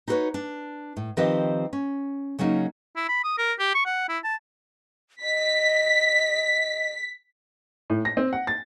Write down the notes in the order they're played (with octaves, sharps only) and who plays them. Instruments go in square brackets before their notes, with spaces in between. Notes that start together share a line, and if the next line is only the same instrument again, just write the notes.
[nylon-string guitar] D#4 E4 F#4 A4 B4 C#5
D4
A2
D#3 F3 C4 G4 B4 D#5
C#4
C#3 F#3 A#3 C#4 D#4
[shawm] E4
B5
D#6
A#4
G4
C#6
F#5
E4
A5
[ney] D#5 [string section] B6
[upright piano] A2
A#6
C4
F#5
A6